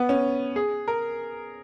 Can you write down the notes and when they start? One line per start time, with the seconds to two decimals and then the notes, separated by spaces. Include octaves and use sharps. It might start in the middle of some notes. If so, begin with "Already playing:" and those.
Already playing: B3
0.09 C#4
0.56 G#4
0.88 A#4